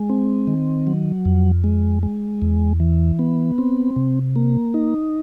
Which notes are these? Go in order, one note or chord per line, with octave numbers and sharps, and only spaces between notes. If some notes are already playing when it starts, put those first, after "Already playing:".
Already playing: G#3
C4
D#3
F#3
F2
G#3
G#3
E2
E3
B3
C4
C3
A#3
D#4